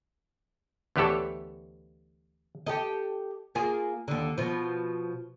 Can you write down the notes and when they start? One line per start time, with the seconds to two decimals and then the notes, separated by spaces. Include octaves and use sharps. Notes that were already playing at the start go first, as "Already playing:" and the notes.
0.96 D2 E3 B3 G4 A4 C#5
2.66 G4 A4 D#5
3.55 A#3 F4 G#4
4.08 D#2 D3
4.38 B2 F3